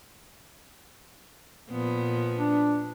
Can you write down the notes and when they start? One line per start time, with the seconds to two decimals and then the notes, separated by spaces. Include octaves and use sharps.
1.70 A#2 F3 B3
2.37 D4